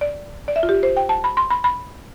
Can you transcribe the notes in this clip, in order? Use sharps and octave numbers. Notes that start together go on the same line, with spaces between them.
D5
D5
E5
F4
G4
C5
G5
A5
B5
C6
B5
B5